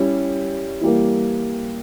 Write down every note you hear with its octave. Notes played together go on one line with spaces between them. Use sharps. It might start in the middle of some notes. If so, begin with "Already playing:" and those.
Already playing: G3 C#4 E4 G4
E3 G3 A#3